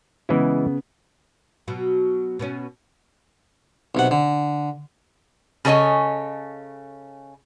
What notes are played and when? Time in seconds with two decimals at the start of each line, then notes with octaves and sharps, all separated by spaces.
0.29 C#3 E3 G#3 B3 E4
1.68 B2 F#3
2.39 B2 B3 C#4
3.95 B1 C3 F#5
4.11 D3
5.65 C#3 A4 C#5 D#5 G#5